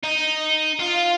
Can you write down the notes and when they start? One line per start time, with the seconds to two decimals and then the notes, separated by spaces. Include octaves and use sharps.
0.04 D#4
0.79 F4